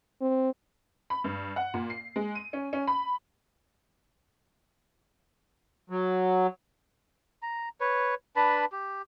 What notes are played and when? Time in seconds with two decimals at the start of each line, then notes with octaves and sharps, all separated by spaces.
0.21 C4
1.10 B5
1.24 G2
1.56 F#5
1.74 A#2
1.90 C7
2.16 G#3
2.35 D#7
2.53 C#4
2.73 C#4
2.87 B5
5.90 F#3
7.42 A#5
7.81 B4 C#5
8.36 D4 B4 A5 B5
8.72 G4